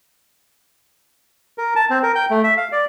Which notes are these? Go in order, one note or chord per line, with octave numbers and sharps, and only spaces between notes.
A#4
A5
C4
A#4
G5
A3
E5
F5
D5